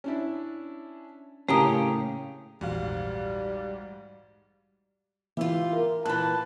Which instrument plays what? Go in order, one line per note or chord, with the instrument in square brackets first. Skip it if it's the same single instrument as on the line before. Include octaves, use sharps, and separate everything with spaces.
[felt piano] C#4 D4 E4
[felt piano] A2 C#3 A#3 [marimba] A3 A#5 D#6 [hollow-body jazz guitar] C#4 G4
[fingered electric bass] A#1 E2 [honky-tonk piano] G#2 F#4 F5 [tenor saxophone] G3
[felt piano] E3 E5 [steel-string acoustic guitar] F4 G4
[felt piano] A#4
[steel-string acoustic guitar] A#2 E3 [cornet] A5 [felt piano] B5 F#6